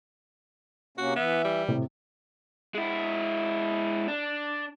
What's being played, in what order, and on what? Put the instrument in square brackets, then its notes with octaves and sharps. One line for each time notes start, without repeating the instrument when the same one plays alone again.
[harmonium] C3 A#3 C#4 [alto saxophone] F#4
[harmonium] E3 E5 [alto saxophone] B3
[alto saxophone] G3
[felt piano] A2 C3
[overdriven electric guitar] G#3 E4
D4